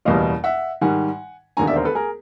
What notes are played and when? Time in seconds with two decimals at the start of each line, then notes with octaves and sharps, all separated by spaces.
0.05 F#1 E2 B2 G3 D#5 F5
0.44 E5 F#5
0.81 G#2 D#3 G3 F#5 G#5
1.57 E1 D#2 D3 G#5 A#5
1.67 D5 E5
1.76 A#4 C5
1.85 A4 B4
1.95 G#4 A#4